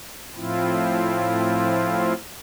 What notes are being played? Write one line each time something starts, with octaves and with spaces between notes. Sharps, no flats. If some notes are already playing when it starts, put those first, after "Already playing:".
A2 F3 C4 E4 F4